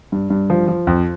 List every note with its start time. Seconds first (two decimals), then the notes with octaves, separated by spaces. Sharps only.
0.12 G2
0.30 G2
0.50 F3
0.68 F3
0.87 F2